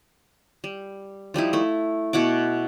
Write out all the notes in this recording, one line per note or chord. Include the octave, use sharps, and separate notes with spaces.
G3
F3 G3 D#4 E4
A3 E4
B2 E4 F#5 D6